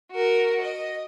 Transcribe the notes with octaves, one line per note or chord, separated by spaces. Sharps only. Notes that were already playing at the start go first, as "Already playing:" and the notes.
F#4 A#4
D#5